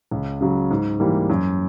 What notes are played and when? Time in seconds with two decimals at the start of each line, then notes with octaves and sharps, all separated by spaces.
0.11 C#2
0.41 C#3 F#3
0.71 G#2
1.00 E3 G3 A#3
1.30 F#2